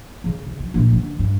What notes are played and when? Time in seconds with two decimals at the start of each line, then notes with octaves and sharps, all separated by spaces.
0.24 C#3
0.46 C3
0.59 F#3
0.74 A#1
0.92 D3
1.19 G2